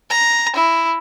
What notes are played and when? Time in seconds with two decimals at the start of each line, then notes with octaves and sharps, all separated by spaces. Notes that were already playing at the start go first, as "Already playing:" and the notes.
0.10 A#5
0.56 E4